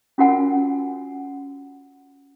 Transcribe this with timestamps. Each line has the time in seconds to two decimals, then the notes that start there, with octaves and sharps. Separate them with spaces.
0.18 C#4 F4 F#4 A#4 F#5 G#5